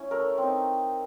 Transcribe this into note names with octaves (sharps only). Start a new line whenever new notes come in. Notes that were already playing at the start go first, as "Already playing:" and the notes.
Already playing: C#4 E4
A3 A#4
C4 D#4